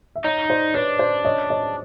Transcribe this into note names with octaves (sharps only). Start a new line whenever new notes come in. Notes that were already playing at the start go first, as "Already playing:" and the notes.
E5
D#4 C#5 D#5
C5 D5
D4 B4 C#5
C5 D5
C#5 D#5
C#5 D#5